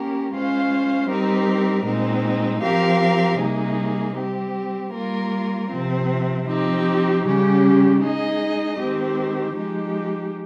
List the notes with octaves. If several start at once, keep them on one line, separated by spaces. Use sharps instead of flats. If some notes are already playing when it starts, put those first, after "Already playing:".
Already playing: A#3 C#4 G4 A#4
G#3 C#4 F4 C5 F5
G3 C4 D#4 G4 A#4
A#2 G#3 C4 D#4
F3 C4 G4 A#4 F5
C3 G3 A#3 D#4 G#4
G3 C4 G4
G3 A#3 F4 A#4
C3 F3 C4
F3 C4 D#4 G4
C#3 G3 C#4 G4
G#3 D#4 G#4 D#5
D#3 G#3 C4 G4
F3 G#3 D#4 G4